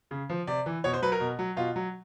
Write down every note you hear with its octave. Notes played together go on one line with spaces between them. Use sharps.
C#3
F3
C3 D5
E3
B2 C#5
C5
F#3 B4
A#4
B2
F#3
B2 F4
F#3